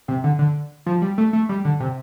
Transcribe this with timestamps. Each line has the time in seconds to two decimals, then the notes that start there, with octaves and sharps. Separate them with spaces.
0.08 C3
0.24 D3
0.39 D3
0.86 F3
1.02 G3
1.18 A3
1.33 A3
1.49 G3
1.65 D3
1.80 C3